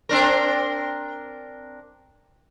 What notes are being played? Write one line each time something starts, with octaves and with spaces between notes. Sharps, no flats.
C4 D4 A#4